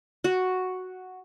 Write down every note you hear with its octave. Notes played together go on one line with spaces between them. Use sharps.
F#4